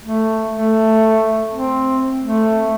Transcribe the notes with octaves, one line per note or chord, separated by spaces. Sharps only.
A3
A3
C4
A3